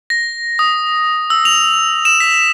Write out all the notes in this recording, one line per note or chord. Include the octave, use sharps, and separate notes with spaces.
A#6
D#6
E6
F7
E7
B6